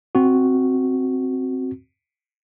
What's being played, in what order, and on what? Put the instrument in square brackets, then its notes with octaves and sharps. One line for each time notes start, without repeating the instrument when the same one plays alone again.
[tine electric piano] C4 F#4